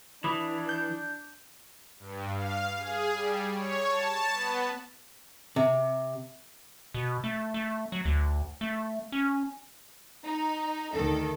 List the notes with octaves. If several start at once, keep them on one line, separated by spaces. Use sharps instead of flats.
E3 D4 B5 D6 D#6
G6
G2
F5
G#4
G3
C#5
A5
B3
C3
B2
A3
A3
F#3
D2
A3
C#4
D#4
D2 D#3 A4